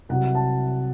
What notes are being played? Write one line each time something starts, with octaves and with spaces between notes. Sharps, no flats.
C2 C3 F#3 F#5
A5